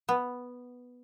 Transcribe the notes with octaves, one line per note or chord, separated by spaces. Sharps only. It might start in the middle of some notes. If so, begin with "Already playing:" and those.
B3